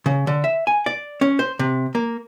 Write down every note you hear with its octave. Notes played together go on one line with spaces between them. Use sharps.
C#3
D3
E5
G#5
D5
C#4
C5
C3
A#3